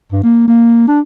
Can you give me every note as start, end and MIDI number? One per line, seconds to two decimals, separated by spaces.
0.12 0.23 43
0.24 0.48 58
0.48 0.87 58
0.88 1.00 62